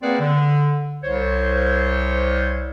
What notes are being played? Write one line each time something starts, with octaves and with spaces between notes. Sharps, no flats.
A#3 C4 G#4 B4 D5 F#5
D3
C2 C5 C#5